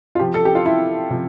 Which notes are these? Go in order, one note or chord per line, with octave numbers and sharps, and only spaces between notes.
F4
C3 F3 G4
A4
G4
F4
E4
C3 F3